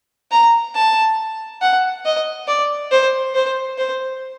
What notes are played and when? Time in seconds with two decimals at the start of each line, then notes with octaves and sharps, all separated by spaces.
0.32 A#5
0.75 A5
1.62 F#5
2.05 D#5
2.48 D5
2.91 C5
3.35 C5
3.78 C5